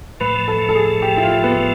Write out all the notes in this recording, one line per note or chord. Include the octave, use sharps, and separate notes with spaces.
A2 F3 A3 B4
A4
A4
G#4
G4
E4
F4
B3